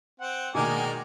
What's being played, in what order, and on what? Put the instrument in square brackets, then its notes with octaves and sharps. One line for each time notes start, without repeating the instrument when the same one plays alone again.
[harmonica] C4 [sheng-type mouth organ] F#5
[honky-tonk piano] B2 D#3 A#3 [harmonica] G#3 A#4 D5 [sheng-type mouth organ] G#5